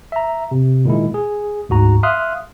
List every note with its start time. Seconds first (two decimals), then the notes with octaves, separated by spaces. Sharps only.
0.12 E5 A#5
0.51 C3
0.85 A#2 D#3 G#3 E4
1.14 G#4
1.69 D2 G#2 F#4 A#5
2.03 E5 F5 C6 D#6 F6 F#6